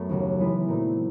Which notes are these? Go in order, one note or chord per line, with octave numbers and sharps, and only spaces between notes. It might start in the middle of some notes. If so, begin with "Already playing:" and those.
Already playing: F#2 A3 B3
D#2 C#3 F#3
E3 G#3 B3
A#2 F#3 A3 C4 D#4